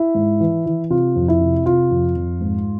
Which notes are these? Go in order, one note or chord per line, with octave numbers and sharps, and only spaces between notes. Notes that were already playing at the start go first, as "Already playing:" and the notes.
Already playing: E4
G#2
E3
E3
C3 F4
F2
E4
C3
C3 F4
F2
F2
G#2